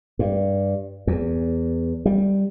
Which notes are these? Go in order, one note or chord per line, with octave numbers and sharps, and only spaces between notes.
G2
E2
G3